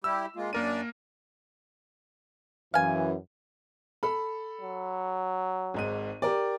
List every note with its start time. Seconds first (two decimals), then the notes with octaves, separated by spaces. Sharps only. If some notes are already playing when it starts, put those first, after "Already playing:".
0.04 G3 E4 G4 E6
0.36 G#3 A#3 F4
0.53 F#2 A#3 D4 A#4 D5 D#7
2.74 F#2 E3 F5 G#5
4.03 A4 B5
4.61 F#3
5.74 G#1 G#2 D#7
6.22 G4 A#4 D5